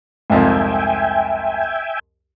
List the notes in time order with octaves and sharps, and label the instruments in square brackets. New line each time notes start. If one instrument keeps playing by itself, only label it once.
[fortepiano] C2 F2 G#2 [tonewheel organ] E5 G5 G#5